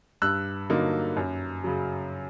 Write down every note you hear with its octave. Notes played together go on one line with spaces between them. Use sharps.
G2 E6 F#6
D3 F#3 A#3 D#4
F#2
C#3 F#3